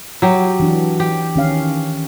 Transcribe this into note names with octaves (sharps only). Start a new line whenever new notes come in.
F#3 G4
E3 D4
G4
D#3 C#4 F5